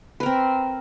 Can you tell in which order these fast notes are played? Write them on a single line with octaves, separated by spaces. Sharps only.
B4 A#4 C4